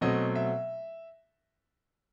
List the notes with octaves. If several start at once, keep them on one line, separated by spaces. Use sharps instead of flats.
B2 F#3 A3 C4 D#5
E5